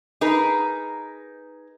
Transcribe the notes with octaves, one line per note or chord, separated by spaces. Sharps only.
D#4 G#4 A#4 B4